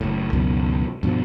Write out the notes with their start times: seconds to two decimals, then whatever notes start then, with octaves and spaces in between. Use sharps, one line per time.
0.01 F#1 A2
0.33 C#2 F#2 B2 D#3
1.03 G2 B2 F3